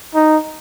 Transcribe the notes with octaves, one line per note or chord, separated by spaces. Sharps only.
D#4